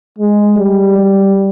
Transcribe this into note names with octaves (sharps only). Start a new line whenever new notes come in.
G#3
G3
G3